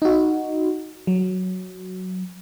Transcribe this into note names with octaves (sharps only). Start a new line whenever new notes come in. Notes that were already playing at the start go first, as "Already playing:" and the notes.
D#4 F#4
F#3